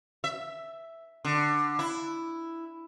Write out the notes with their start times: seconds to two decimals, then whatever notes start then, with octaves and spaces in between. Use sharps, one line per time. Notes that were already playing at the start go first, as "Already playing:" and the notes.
0.24 E5
1.25 D3
1.79 E4